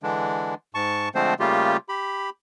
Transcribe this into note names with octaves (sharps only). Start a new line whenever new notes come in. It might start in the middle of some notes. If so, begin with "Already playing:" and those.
D3 E3 G#3 D4
G#2 A5 C#6
D3 F3 G#3 A3 C4 C5
C#3 G3 A3 A#3 F4 G4
G4 B5